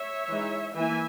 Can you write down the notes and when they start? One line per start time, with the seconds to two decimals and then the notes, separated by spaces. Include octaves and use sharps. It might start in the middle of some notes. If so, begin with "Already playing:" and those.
Already playing: C#5 E5
0.29 E3 G#3 D#4
0.76 E3 A#3 E4 E5 G#5